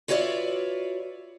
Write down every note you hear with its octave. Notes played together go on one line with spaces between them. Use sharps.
F4 F#4 B4 C#5 D5 E5